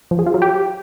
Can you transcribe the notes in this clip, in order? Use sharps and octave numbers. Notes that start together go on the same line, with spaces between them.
F3
G#4
F4
F#3
G4